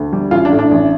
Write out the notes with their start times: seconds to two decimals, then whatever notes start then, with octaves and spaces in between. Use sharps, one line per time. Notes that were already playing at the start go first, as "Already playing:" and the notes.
Already playing: D2
0.13 G3
0.31 A1 F4
0.45 D4
0.52 A2
0.59 D4
0.71 A1